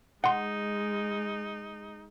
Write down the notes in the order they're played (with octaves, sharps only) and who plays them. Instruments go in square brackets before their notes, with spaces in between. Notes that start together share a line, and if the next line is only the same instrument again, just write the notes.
[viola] G#3 [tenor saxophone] D#4 [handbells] F#5 C6